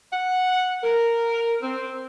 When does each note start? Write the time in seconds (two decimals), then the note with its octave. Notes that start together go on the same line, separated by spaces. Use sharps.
0.13 F#5
0.84 A#4
1.62 C4